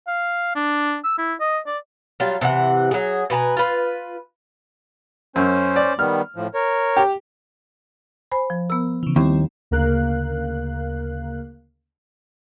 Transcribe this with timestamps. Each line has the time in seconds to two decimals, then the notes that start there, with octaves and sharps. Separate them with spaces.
0.07 F5
0.55 D4
1.04 E6
1.18 E4
1.40 D#5
1.67 D5
2.20 F#3 G3 F4
2.41 C3 E3 G#4 F#5
2.91 F#3 G#4
3.30 B2 B4 G#5 A#5
3.57 F4 B4
5.36 F#2 C#4 C5
5.76 D5
5.99 D#3 G3 B3 F6
6.36 A2 F3
6.54 A#4 C#5
6.97 G4
8.31 C5 G#5 B5
8.50 F3
8.70 B3 A#4 E6
9.03 C#3 E3
9.16 D#2 G3 C4 E4
9.71 D2 C#3 A#3 A#4 F5 F#6